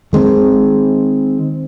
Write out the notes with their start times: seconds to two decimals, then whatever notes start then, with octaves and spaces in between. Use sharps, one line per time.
0.13 D#3 G#3 A#3 C4